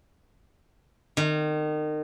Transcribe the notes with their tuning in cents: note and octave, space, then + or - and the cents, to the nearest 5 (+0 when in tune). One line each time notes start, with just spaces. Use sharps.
D#3 -30